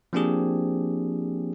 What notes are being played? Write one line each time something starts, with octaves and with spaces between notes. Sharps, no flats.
F3 A#3 C4 D4 G4 G#4